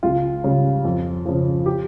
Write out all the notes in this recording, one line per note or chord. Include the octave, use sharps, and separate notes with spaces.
C#2 F4
C#3 G3
F2
C#3 F3
G4